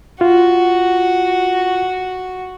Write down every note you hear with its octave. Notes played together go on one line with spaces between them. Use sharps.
F4 F#4